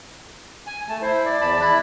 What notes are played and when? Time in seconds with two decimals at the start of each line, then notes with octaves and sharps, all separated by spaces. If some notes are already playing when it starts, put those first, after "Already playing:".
0.67 G#5
0.89 A3 A5
1.02 E4 C5
1.25 D5
1.41 E2 A5 B5
1.61 E4 B5 F#6